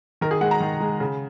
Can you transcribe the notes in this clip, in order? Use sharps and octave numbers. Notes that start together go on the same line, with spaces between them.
D#3 A#4
G#4
G#3 F#5
A#5
D#3
G#3
C#3